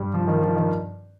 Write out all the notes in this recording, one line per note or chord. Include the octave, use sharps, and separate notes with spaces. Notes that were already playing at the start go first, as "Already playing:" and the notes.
Already playing: G2 G3
F3
D#3
F3
D#3